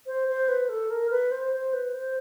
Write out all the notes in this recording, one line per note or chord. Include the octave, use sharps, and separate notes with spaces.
C5
C5
B4
A4
A#4
B4
C5
C5
B4
C5